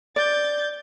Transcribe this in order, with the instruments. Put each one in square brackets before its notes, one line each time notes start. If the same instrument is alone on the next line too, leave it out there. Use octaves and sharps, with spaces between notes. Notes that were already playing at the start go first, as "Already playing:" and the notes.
[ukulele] D5 [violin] G6 A6